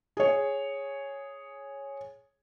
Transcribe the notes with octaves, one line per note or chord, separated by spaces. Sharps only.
G#4 C#5